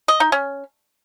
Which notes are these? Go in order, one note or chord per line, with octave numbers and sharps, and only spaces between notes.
D#5
D#4
C#4